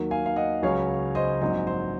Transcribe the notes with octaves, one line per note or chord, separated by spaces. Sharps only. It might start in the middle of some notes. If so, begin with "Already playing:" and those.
Already playing: D#2 D#3 F#3 A#3
F5 G#5
F5
D#5 F#5
C#2 C#3 F#3 C#4 C#5 F5
C5 D#5
A#1 G#2 F#3 C4 C5 D#5
C5